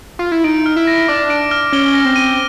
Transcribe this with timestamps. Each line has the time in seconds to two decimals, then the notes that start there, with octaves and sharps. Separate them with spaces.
0.19 F4
0.32 E4
0.44 D#4 D7
0.66 F6
0.76 E4
0.87 A#6
1.08 D4 D6
1.30 D7
1.51 F6
1.73 C#4 G7
1.94 A#6
2.05 C4
2.16 D#7